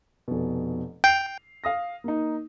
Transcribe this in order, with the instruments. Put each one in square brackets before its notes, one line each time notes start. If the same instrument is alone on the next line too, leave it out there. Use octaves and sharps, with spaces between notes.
[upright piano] F1 B2
[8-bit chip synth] G5 [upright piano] C7 F7
[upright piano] F5 D#6 A#6
A#3 D#4